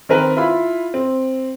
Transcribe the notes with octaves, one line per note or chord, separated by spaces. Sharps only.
D#3 C4 A#4 B4
E4 F4 B5
C4